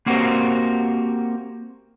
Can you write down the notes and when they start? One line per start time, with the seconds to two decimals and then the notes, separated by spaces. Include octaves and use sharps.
0.06 A#3 C4 F#4 G4 A#4 C5